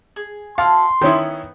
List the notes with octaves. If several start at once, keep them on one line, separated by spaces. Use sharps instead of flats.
G#4
E4 F#4 F5 A5 C6
D#3 B3 C#4 E4 C#5 G6